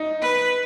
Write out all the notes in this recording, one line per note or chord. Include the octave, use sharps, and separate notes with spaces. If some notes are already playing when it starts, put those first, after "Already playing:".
Already playing: D#4
B4